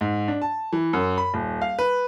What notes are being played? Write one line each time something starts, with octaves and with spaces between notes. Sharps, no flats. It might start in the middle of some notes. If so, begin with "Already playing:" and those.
G#2
D4
A5
E3
F#2
B5
D#1
F5
B4